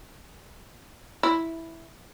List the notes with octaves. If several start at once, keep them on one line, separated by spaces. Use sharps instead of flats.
E4